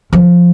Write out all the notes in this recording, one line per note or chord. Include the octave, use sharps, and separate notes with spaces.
F3